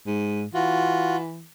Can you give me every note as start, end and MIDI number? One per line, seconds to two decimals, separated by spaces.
0.07 0.45 44
0.54 1.47 52
0.54 1.16 65
0.54 1.16 66